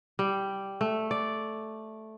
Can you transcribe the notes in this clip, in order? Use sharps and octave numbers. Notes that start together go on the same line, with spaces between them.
G3
A3
D5